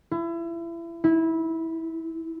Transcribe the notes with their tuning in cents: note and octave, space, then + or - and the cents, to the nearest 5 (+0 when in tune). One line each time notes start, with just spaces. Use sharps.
E4 +30
E4 -20